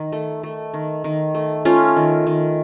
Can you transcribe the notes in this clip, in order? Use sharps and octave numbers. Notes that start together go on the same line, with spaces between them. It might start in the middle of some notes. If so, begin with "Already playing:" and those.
Already playing: D#3
A3
A3
D#3
D#3
A3
A3 C#4 F4
D#3
D#3